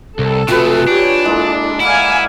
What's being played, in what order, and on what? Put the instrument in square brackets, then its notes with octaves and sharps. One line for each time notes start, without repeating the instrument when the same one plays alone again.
[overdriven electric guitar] C2 [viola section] A4
[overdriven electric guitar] C3 A3 [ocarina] F4 [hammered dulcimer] F#4 G#4 B4
[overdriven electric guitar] D4 [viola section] G4 C#5 G5
[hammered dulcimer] G#3 A#3 [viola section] E4 A4 D5
[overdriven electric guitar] E4 [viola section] D5 F5 G#5 [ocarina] F#5